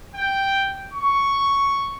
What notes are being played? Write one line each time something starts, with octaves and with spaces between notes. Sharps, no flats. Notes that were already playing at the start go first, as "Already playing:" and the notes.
G5
C#6